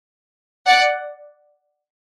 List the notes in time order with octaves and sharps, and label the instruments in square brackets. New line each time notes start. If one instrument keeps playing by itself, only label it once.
[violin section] D5 F#5